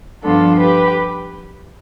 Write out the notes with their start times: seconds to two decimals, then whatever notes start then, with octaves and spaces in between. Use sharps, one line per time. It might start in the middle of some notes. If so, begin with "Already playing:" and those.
0.24 G2 F3 B3 D4 F4 A4
0.59 G4 B4